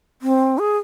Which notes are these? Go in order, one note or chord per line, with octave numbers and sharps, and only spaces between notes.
C4
G#4